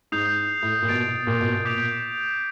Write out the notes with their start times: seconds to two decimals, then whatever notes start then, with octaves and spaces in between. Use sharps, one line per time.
0.12 G#2 D#6 G6 C7 F7
0.62 A2
0.82 A#2
0.88 B2 A6 D7 F7
1.27 A#2
1.40 B2
1.53 A#2
1.65 D6 G6 B6 D7 F7